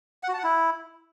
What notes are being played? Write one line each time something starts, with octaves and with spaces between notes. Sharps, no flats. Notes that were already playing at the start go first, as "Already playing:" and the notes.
F#5
F#4
A5
F#5
E4